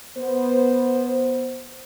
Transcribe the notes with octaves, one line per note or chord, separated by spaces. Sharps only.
B3 C5